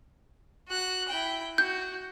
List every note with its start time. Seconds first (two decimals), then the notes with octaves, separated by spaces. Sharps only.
0.68 F#4 F#6
1.08 E4 G5
1.58 F#4 G6